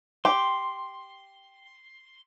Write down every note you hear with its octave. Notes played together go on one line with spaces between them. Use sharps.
G4 G5 C6